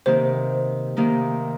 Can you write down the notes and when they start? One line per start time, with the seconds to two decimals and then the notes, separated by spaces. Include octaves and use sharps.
0.06 C3 D#3 A#3 D#4 C5
0.97 C3 D#3 A#3 D#4